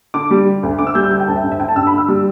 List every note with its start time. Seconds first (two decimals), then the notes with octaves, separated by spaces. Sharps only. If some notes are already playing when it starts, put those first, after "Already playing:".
0.14 D3 D6
0.31 G3
0.47 D3
0.63 D2
0.79 D2 D6
0.87 E6
0.95 G3 G6
1.03 E6
1.11 D3 G6
1.20 G5
1.28 D2 A5
1.36 E5
1.43 G2
1.52 E5
1.60 D3 G5
1.68 A5
1.76 G2 E6
1.87 B5
1.92 D3
1.98 E6
2.08 G3 E6